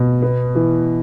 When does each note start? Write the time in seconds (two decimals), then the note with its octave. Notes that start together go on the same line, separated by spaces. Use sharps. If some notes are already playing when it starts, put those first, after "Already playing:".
Already playing: B2
0.22 B3
0.55 E3